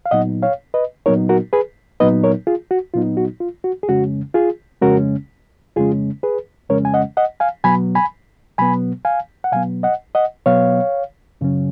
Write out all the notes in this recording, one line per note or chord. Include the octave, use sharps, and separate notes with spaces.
F5
A#2 F#3 B3 D#4 D#5 F#5
C#5 F5
B4 D#5
A#2 F#3 B3 D#4 A#4 C#5
F#4 A#4
G#4 B4
A#2 F#3 B3 D#4 B4 D#5
A#4 C#5
F4 G#4
F#4
A#2 F#3 B3 D#4 F4
F#4
F4
F#4
G#4
F2 C#3 G#3 C#4 F#4
F4 G#4
F2 C#3 G#3 C#4 F#4 A#4
F2 C#3 G#3 C#4 F4 G#4
G#4 B4
F2 C#3 G#3 C#4 A#4 C#5
G#5
D#5 F#5
D#5 F#5
F5 G#5
B2 F#3 B3 G#5 B5
G#5 B5
B2 F#3 B3 G#5 B5
F5 G#5
F#5
B2 F#3 B3 F5 G#5
D#5 F#5
D#5 F#5
B2 F#3 B3 C#5 F5
F#2 C#3 F#3 C#4